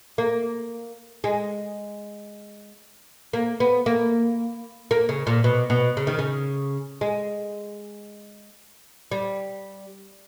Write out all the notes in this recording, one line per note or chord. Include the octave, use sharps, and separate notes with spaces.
A#3
G#3
A#3
B3
A#3
A#3
C#3
A#2
B2
B2
C#3
D#3
C#3
G#3
G3